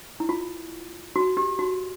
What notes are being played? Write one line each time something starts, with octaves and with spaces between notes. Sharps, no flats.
E4
F4
F#4
G4
F#4